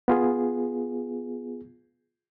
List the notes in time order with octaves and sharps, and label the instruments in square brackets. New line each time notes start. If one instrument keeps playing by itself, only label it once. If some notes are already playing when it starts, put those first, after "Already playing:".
[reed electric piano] B3 F4 G#4